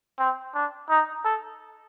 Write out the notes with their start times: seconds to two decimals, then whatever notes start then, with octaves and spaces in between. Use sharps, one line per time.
0.19 C4
0.55 D4
0.90 D#4
1.25 A4